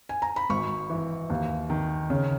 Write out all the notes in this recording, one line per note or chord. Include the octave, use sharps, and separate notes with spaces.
G#5
A#5
B5
G#1 C#6
E3
D#2
D#3
C#3